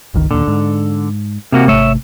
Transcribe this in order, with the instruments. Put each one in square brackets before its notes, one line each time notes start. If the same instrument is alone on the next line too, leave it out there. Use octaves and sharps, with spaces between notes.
[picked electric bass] G1 C#2 D#3
[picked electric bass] D#2 A#2 [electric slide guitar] D3
[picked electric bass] G#2
[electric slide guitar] C3 A#3 F#4
[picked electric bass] G#1 C3 A3 [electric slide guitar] C#5 E5